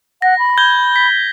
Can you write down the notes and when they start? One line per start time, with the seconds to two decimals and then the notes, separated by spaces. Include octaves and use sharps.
0.22 F#5 A#6
0.39 B5
0.58 G6 G#6 G7
0.96 B6